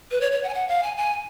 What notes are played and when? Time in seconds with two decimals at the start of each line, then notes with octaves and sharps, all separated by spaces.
0.11 B4
0.21 C#5
0.32 C#5
0.44 F#5
0.49 G#5
0.54 F#5
0.68 F5
0.83 G#5
0.97 G#5